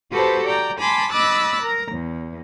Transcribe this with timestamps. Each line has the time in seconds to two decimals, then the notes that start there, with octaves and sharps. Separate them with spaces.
0.11 F#4 G4 A4 B4 C5 A5
0.46 D5 G5 A#5
0.78 G#5 A5 B5 C6 D6
1.11 D#5 B5 D6 E6 F#6 A6
1.62 A#4 A#5
1.91 E2